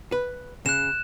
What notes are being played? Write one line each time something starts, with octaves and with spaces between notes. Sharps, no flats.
B4
C#3 F#6 E7